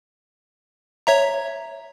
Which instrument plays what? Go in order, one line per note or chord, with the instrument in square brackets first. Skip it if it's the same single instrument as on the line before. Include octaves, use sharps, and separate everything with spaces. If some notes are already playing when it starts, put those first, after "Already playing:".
[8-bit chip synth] C#5 E5 A#5